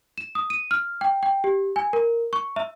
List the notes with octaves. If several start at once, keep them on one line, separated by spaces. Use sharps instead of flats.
E7
D#6
D#7
F6
G5
G5
G4
G#5
A#4
C#6
E5